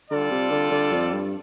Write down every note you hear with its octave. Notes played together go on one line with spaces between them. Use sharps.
D3 G3 F4 A4 D5
C3
D3
D3
F2
G2